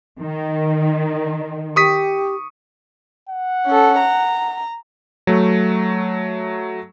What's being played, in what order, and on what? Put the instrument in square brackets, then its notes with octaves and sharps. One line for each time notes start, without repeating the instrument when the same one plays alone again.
[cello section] D#3
[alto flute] G4 [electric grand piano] C#6 D#6 B6
[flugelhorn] F#5
[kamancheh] C#4 A4
A#5
[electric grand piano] F#3 A3